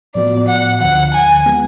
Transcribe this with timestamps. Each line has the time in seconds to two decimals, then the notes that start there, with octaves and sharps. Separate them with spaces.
0.15 A2 F3 B3 F#4 D5
0.49 F#5
0.81 D2 D3 F3 F#5
1.14 G#5
1.46 F3 G#3 B3